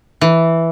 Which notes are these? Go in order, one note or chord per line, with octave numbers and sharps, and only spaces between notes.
E3